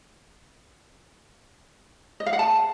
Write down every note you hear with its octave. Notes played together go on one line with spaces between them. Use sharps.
D#5
F5
F#5
A5